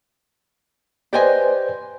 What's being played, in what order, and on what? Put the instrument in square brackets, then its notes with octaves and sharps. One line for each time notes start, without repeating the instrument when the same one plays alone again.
[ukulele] G4 D#5 G#5 [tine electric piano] B4 C5 D5